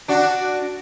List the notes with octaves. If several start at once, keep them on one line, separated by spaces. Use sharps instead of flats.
D4 F#4